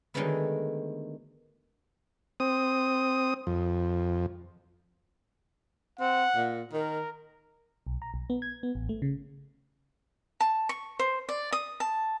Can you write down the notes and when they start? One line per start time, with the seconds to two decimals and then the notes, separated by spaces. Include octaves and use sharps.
0.14 D3 D#3 F#3 G#3 A3 B3
2.40 C4 D#6
3.47 F2
6.00 C4 F#5
6.35 A#2
6.73 D#3 A#4
7.87 B1
8.02 A#5
8.14 B1
8.30 B3
8.42 G#6
8.63 B3
8.75 A1
8.89 A3
9.02 C#3
10.40 A5
10.69 C#6
10.99 C5
11.29 D5
11.52 D#6
11.80 A5